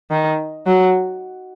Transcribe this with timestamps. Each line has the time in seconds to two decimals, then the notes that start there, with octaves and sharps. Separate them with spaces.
0.11 D#3
0.67 F#3